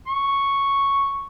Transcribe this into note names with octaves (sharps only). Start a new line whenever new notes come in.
C#6